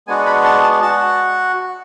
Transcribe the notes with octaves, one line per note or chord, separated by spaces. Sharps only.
G#3 B3 D4 F#4 G#5
B5
A5
A5
F#4 A5